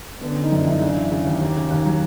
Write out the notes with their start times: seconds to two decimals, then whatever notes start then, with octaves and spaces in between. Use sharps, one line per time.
0.21 D3 B3
0.32 D3 C#4
0.42 D#4
0.52 F#2 D4
0.62 E4
0.67 F#2 D#4
0.81 C#3 D4
0.97 E3
1.11 C#3
1.26 D#2
1.41 D#2
1.56 C#3
1.71 D#2
1.86 F#3